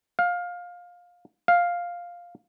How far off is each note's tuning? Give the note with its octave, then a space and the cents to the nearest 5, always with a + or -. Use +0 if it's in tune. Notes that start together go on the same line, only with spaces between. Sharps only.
F5 +20
F5 +5